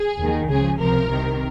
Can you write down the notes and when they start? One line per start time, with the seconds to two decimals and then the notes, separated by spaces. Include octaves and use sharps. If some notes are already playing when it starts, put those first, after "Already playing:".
Already playing: G#4
0.20 D#2 D#3
0.49 C#2 C#3 F3 G#4
0.79 C#2 C3 F3 A#4
1.09 C2 C3 D#3